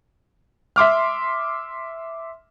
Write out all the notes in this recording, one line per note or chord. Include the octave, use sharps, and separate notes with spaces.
E5 C6 D6 F6